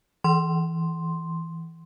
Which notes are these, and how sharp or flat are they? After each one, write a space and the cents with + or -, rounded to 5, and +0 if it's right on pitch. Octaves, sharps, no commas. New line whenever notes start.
E3 +0 C6 +0